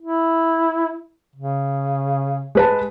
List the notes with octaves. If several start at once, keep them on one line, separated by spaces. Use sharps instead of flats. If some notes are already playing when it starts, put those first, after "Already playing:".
E4
C#3
G#3 B4 A5